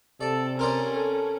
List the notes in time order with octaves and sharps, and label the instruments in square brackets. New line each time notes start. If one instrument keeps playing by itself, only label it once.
[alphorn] C3 [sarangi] A4 [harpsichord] D5
[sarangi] C#4 [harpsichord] A#4 C5 D5
[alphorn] A4